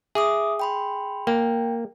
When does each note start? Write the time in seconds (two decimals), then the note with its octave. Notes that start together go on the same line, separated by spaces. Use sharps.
0.15 G#4 E5 D6 D#6
0.59 G5 B5 C6
1.27 A#3 G5